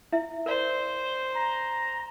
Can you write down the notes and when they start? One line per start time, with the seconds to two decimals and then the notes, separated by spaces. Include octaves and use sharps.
0.12 E4 E5
0.46 A#4 C5 D5
1.35 A#5